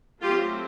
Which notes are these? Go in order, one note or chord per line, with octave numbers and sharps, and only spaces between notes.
F#3 A3 C4 F4 G4